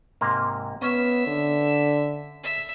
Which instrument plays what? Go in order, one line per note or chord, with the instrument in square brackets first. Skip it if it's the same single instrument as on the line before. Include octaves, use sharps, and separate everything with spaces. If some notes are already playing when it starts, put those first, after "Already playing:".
[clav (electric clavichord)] G#2 C3 A#3
[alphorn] B3 [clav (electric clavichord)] C#4 [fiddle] E5
[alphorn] D3
[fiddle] E5